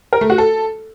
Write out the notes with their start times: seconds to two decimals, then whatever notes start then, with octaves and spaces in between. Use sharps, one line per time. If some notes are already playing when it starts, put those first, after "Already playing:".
0.13 A#4
0.21 A3
0.30 F#4
0.38 A4